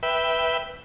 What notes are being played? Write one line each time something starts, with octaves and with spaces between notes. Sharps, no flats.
B4 E5 G5